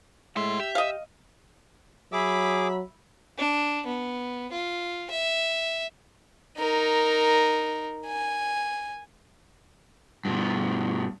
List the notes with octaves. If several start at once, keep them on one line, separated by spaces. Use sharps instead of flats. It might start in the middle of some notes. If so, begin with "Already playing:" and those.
A2 G#3 E5 F#5 C6
G4 E5
D#5 F5
F#3 G#4 E5 B5 D6
D4
B3
F4
E5
D#4 A#4
G#5
G2 B2